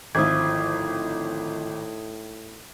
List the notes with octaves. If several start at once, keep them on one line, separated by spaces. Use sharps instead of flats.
G#1 A2 D3 F3 E4 D#6 G#6